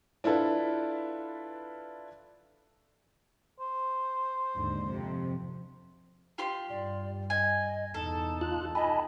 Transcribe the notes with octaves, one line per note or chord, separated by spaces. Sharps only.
D4 E4 F4 A4 B4
C5
D#2 G#2 D3
F2 C3
F4 G4 C6
G2 D5
D#5 G#5
E2 D#4 A4 A5
F4 F#6
D#4 D#5 G#5 A5 B5